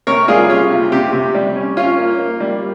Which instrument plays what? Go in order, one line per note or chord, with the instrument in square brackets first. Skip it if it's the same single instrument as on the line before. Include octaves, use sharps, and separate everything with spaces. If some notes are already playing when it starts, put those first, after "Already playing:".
[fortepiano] C3 A#4 C#5
G3 F4 G#4
C#4 F4
C3
C3 G4
C3
G3
C#4
C#4 F4
A#3
A#3
G3